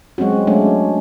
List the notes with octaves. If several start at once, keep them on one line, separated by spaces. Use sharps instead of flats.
F#3 G#3 C4 C#4 F#4
F#3 G#3 A3 C#4 D4